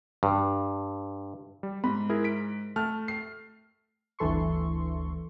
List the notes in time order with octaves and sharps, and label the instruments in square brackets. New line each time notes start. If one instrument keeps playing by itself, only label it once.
[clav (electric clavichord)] G2
[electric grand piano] G3
[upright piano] G#2 [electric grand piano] B5
[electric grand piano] E4 G#4 A#4
B6 D7
[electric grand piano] A3 A5 [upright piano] F6
[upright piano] C7
[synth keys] G1 D2 E3 A4 C6 C#6